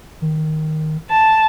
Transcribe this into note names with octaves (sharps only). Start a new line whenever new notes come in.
D#3
A5